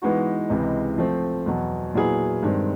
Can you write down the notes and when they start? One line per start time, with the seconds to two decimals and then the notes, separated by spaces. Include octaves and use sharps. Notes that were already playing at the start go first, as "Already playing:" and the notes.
0.02 E3 G#3 B3 D#4 F#4
0.50 C#2 C3 E3 G#3
0.98 F3 A3 C4
1.46 E2 B2 F#3
1.94 A#2 F#3 B3 E4 G#4
2.43 G2 D#3 G#3 C4